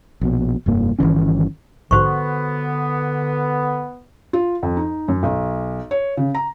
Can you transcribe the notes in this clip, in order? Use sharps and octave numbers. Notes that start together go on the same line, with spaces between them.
A#1 B2
F1 G2 A#3
G1 D#3 E3 C#4
A#1 G#2 D3 B3 F#4 C5 C#6
F4
F2
D#4
F#2
B1
C#5
C#3
A#5